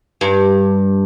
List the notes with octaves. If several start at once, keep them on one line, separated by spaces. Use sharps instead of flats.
G2